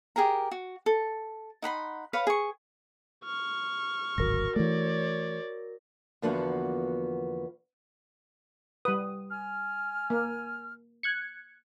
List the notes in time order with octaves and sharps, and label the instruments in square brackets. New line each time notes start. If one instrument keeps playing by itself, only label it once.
[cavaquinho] G4 G#4 A#4 A#5
F#4
A4
D#4 F#5 B5 C6
B4 C#5 F5 F#5
G#4 C#6
[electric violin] C#6 F6
[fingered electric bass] D1 G#1 [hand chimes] F#4 A#4 A#6
[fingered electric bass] E3 A3 [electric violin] C#5 D5
[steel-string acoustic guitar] E2 D3 F3 A#3 B3 F#4
[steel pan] G3 B4 [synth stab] D#6
[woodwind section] G#5 F6
[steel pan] A#3
[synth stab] F#6 G#6 C#7